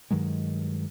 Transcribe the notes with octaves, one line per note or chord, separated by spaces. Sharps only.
G2 D#3 F#3 G#3